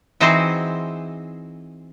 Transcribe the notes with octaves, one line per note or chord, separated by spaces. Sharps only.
E3 C4 D#4 F#4 G#4 C5